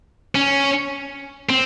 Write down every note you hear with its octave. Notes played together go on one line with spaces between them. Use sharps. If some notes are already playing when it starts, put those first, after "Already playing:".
C#4
C4